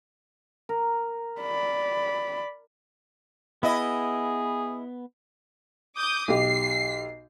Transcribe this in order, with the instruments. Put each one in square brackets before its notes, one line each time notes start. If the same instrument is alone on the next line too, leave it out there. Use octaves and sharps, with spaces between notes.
[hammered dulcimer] A#4
[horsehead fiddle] D5 B5
[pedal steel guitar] B3 [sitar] E4 D#5 [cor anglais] G#4
[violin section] D6 D#6 G6
[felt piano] B1 G4 [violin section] C7